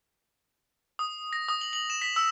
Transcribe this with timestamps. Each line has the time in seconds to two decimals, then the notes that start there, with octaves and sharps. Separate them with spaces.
0.99 D#6
1.33 A#6
1.48 D#6
1.61 F#7
1.73 F#7
1.90 E7
2.02 B6
2.16 E6